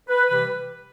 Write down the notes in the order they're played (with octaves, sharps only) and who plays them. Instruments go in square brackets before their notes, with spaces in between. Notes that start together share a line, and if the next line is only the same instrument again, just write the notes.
[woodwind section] B4
C3 E3 G3 B4